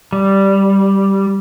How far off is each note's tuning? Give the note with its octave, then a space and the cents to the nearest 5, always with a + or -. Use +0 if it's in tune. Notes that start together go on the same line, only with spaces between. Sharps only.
G3 -5